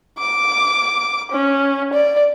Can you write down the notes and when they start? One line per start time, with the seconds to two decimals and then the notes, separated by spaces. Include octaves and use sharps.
0.18 D6
1.32 C#4
1.93 D5